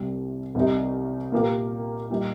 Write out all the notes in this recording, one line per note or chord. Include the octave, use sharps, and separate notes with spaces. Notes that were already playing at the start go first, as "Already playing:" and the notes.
Already playing: C2 C3 G3
C2 C3 G3 D#4
A#2 A#3 G4 A#4
A#2 G3 D#4